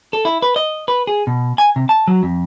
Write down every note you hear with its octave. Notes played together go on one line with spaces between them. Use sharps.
A4
E4
B4
D#5
B4
G#4
B2
G#5
C3
A5
F#3
F2